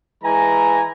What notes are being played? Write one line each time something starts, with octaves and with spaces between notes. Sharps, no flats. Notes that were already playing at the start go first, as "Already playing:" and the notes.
E3 G#3 G#5 A#5